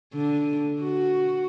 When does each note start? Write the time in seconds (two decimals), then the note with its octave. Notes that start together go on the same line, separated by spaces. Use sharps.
0.14 D3
0.82 F#4